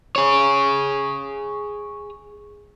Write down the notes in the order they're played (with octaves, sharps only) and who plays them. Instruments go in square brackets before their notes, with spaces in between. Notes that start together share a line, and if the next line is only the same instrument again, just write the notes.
[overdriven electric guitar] G#4 C#5